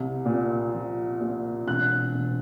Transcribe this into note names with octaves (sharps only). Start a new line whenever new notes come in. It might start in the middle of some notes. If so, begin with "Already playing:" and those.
Already playing: C2
A#2
F3
A#2
E1 F#6
E1